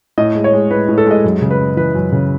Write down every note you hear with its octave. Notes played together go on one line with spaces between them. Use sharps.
A2 D#5
G#3
C#5
G#3
A2 B4
A2
A4
G#3 D#5
F#2
C#3
B4
F#2
E3 B4
F#2
C#3